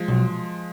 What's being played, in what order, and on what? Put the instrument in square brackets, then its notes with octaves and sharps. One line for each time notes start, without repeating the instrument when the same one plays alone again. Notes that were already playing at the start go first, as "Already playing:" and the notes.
Already playing: [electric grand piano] F3 G#3
[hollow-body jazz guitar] B1